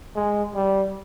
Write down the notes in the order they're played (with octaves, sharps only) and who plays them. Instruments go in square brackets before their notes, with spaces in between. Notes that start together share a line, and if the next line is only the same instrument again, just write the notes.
[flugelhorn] G#3
G3